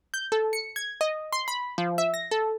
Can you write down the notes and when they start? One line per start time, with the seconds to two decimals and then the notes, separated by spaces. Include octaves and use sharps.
0.14 G6
0.32 A4
0.53 C#7
0.76 G#6
1.01 D#5
1.33 C6
1.48 B5
1.78 F3
1.98 E5
2.14 A#6
2.31 A4